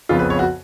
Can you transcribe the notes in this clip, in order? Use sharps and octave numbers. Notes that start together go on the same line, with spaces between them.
F2 C#3 F3 B3 F4
B4
C#5
F#4